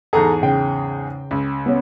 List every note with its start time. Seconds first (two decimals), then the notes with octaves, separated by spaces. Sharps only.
0.13 E2 G#2 G#4 A4 A#5
0.42 C#3 G5
1.31 C#2
1.66 B3 C#4